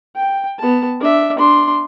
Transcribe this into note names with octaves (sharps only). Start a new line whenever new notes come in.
G5
B3 A5
D4 E5
D4 C6